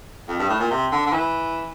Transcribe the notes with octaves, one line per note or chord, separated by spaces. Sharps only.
F2
G2
A2
A#2
C3
D3
D3
E3